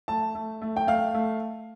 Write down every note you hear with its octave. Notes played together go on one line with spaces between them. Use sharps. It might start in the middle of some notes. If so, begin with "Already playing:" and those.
A3 A5
A3
A3
G5
A3 F5
A3